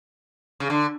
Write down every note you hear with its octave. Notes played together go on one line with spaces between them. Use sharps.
C#3
D3